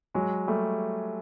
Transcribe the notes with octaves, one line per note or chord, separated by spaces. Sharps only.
F#3 G#3
G3 A3